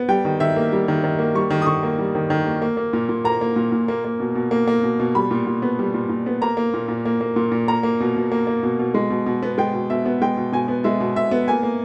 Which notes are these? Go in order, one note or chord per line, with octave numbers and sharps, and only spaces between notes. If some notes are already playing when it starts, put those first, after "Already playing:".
Already playing: B3
G3 G5
D#3
D#3 E5
A#3
G3
D#3
D#3
A#3
G3 C#6
D#3
D#6
D#3 C#6
A#3
G3
D#3
D#3
A#3
A#3
A#3
A#2
A#2
A#3 A#5
A#3
A#2
A#2
A#3
A#3
B2
B2
A#3
A#3
B2
B2
G3 B5
A#2
A#2
B3
G3
A#2
A#2
B3
A#3 A#5
A#3
A#2
A#2
A#3
A#3
A#2
A#2
A#3 A#5
A#3
B2
B2
A#3
A#3
B2
B2
G#3
B2
B2
B3
G#3 G5
B2
B2 E5
B3
G#3 G5
B2
B2 G#5
B3
G#3 E5
B2
B2 E5
B3
A#3 G#5
A#3